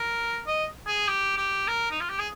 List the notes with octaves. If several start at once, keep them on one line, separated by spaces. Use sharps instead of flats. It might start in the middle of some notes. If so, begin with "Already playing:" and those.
Already playing: A#4
D#5
G#4
G4
G4
A#4
D#4
F4
G4
G#4